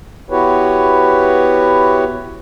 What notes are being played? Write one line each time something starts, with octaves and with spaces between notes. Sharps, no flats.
B3 E4 F#4 G4 B4 C#5